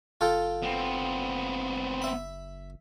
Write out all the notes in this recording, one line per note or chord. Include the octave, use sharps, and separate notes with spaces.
F#1 F4 A4 G5
B3 C4
E5 B5